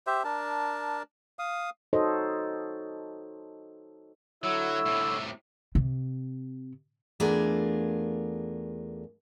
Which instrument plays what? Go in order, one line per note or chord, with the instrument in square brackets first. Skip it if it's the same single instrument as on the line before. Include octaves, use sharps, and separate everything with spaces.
[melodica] G4 C5 E5
D4 A#4 A5
F5 D#6
[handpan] D#4 F#4 A4 C5 C#5 D#5
[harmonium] D3 C#5 [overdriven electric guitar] F#3 [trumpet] E4 [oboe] E6
[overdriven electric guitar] A2 C3
[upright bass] C3
[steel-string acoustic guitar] E2 A3 D4 F4 G#4 A#4